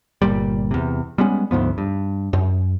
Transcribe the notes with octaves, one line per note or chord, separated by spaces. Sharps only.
G1 A#2 G3
E2 C3
G3 G#3 B3 C#4
D2 G#2 F3 B3
G2
F#2